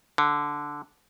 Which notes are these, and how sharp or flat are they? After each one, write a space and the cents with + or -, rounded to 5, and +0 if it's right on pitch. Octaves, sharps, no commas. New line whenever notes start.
D3 -5